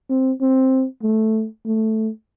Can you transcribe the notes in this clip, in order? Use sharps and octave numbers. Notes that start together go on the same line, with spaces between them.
C4
C4
A3
A3